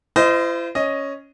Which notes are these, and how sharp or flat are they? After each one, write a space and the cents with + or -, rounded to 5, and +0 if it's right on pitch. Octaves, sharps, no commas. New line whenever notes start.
E4 +45 C5 -30 D#5 +0
C#4 +0 D#5 +0